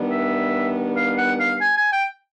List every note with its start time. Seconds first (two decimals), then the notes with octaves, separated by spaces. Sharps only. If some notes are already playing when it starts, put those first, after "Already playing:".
Already playing: D#3 G3 B3 D4
0.11 E5
0.96 F5
1.18 F#5
1.40 F5
1.61 G#5
1.77 G#5
1.92 G5